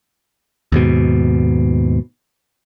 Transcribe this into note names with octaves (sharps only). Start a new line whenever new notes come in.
D#2 G#2 B2